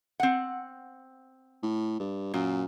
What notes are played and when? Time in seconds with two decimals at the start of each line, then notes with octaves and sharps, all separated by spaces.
0.20 C4 F#5
1.63 A2
2.00 G2
2.34 F#2 A#2